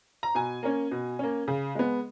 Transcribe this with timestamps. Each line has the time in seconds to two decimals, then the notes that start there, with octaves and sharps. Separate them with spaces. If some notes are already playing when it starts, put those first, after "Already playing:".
0.23 A#5
0.35 B2 G#5
0.63 A#3 C#4
0.91 B2
1.19 A#3 C#4
1.48 C#3
1.75 G#3 B3